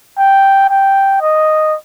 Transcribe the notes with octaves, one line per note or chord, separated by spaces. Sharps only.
G5
G5
D#5